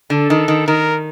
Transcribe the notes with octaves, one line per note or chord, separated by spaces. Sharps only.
D3 A4
D#3
D#3
D#3 A#4